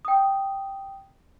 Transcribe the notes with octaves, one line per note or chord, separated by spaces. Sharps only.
G5 D#6